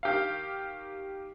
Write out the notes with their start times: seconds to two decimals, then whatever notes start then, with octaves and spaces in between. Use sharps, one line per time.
0.03 D#3 G4 F5